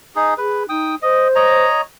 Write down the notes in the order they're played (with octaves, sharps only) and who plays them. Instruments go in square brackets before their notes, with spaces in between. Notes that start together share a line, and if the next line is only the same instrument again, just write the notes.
[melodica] D#4 G#4
[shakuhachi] G#4 [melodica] B4
[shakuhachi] D#4 [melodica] G5 D#6
[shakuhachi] C5 [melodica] D#5
[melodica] C#5 D#5 A#5